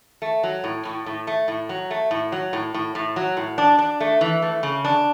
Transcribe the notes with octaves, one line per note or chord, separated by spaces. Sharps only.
A3
F#3
A2
A2
A2
A3
A2
F#3
A3
A2
F#3
A2
A2
A2
F#3
A2
D4
D4
A3
E3
A3
C#3
D4